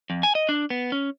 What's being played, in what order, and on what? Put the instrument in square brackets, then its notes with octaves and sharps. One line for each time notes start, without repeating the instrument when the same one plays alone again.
[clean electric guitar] F2
G#5
D#5
D4
B3
C#4